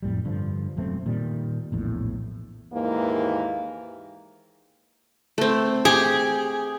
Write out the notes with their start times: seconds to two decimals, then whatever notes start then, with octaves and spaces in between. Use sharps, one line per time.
0.03 F2 A2 G3
0.25 G2 D3 F3
0.77 E1 F#2 A3 C4
1.06 A#2 D#3 G3
1.72 A#1 E2 A2
2.73 D#2 G#2 E3 A#3
5.38 A3 C4
5.85 G4 G#4